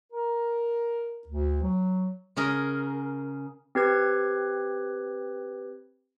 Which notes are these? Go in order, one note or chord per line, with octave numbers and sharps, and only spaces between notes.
A#4
D2
F#3
C#3 C#4 G#4 A#4
C4 G4 B4 G#6